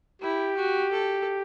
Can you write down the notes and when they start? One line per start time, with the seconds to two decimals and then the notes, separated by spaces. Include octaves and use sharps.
0.21 E4 G4
0.56 F#4
0.92 A4